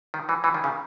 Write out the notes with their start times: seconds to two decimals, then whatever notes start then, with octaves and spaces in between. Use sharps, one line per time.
0.14 D#3
0.29 E3
0.44 E3
0.54 D#3
0.64 C#3